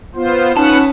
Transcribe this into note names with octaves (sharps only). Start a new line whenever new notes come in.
B3 F4 C5
C#4 D#4 B4 F#5 A5